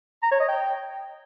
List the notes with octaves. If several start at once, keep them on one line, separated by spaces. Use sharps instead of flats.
A#5
C#5
D#5
G5